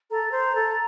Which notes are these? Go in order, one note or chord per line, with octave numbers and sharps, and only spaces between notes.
A4 A#5
C5
A4